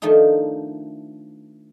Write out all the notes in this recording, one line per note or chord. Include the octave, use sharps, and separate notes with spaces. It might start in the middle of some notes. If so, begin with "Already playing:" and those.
D#3 F3 A3 D4 D#4